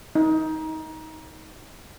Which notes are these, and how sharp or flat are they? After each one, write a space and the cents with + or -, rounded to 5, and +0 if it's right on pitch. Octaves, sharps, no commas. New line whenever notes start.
D#4 +20